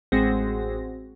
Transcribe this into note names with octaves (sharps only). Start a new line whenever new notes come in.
A1 G#3 C4 F#4 A#6